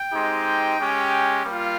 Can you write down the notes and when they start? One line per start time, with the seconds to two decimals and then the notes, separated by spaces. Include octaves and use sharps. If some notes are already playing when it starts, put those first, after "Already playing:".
Already playing: G5
0.11 G#3 C4 D#4 G4
0.79 G#3 C#4 G4
1.44 G3 A#3 F4